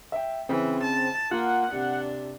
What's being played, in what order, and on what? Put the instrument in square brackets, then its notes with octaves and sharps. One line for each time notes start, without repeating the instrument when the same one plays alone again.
[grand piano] E5 G5
[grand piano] C#3 [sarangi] E3 [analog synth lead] C4
[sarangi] A5
[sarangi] A#3 [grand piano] F4 [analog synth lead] F#5
[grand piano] C3 [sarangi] D4